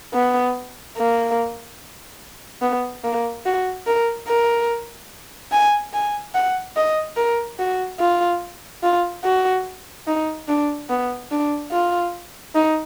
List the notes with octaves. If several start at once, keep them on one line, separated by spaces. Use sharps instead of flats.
B3
A#3
B3
A#3
F#4
A#4
A#4
G#5
G#5
F#5
D#5
A#4
F#4
F4
F4
F#4
D#4
D4
B3
D4
F4
D#4